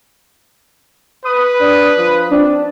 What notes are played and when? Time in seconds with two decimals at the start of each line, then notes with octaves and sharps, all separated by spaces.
1.25 B4 D#6
1.60 D4
1.97 F3
2.31 C4 D4